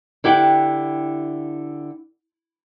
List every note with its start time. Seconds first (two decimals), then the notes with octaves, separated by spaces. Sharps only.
0.24 D3 E4 G4 F#5 G5